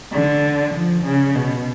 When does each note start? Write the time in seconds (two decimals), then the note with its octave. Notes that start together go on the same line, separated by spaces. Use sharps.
0.12 D3
0.74 F3
1.05 C#3
1.35 B2